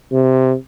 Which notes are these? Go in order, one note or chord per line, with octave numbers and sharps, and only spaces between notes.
C3